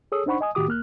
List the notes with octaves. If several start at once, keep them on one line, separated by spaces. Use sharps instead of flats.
G#4 A4 C#5 D#6 E6
D4 D#4 C5 F#5 B5 C#6
D#5 G#5 D#6
A2 D#3 F#4 G4 D6 D#6
C2 A#3 F6 F#6